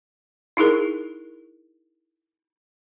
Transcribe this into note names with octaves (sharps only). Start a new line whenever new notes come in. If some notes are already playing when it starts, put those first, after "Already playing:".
D#4 E4 G#4 A#4